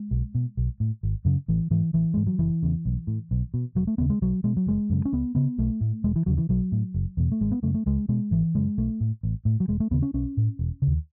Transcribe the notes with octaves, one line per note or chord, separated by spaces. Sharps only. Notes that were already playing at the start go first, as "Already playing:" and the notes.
Already playing: G#3
B1
B2
B1
A2
G#1
F#2 C#3
A1 E3
G#2 E3
A1 E3
G#2 G#3
F#3
F#1 E3
E2 C#3
B1
A2
B1
B2
E1 F#3
A3
D#2 C#3 B3
G#3
B1 F#3
B2 G#3
F#3
F#1 G#3
F#2 C#3
C#4
C#2 B3
C#3 B3
B1 A3
A2
E1 G#3
E3
D#2 C#3 F#3
E3
B1 F#3
A2
F#1
E2 B2
A3
G#1 G#3
B3
F#2 C#3 A3
A3
C#2 G#3
B2 G#3
G#1 E3
F#2 C#3 G#3
B1 A3
A2
A1
A2
F#3
E1 G#3
A3
D#2 C#3 B3
C#4
B1 C#4
A2
E1
C#3
D#2